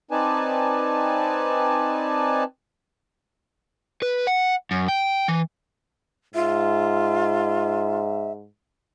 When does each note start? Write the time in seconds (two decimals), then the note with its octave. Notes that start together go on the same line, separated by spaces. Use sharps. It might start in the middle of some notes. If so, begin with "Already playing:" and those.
0.11 C4 D#4 B4 D5 G#5 A5
4.02 B4
4.27 F#5
4.71 F#2
4.88 G5
5.28 E3
6.35 G#2 F4 E5